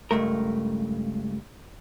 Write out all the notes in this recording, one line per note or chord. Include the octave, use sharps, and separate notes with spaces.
C#2 G2 A3 A#4